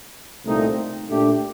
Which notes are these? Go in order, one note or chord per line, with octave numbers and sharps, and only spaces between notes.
C2 A#2 A3 C4 D#4
A#2 A3 D4 G4